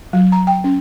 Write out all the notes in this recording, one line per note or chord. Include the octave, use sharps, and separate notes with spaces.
F#3
A#5
G5
C#4